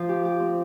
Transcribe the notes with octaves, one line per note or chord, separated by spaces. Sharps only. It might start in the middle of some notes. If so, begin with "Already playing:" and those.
Already playing: F3
G4
G4
C4